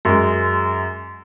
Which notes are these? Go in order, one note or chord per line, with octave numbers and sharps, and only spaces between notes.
F#2 G#3